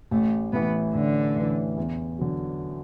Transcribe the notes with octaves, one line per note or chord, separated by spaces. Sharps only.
A1 A3
A2 E3 B3
A1 D3
A2 E3
E2
D3 F#3